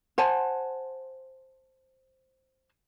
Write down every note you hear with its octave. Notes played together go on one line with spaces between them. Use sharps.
C5 F#5 G#5 A5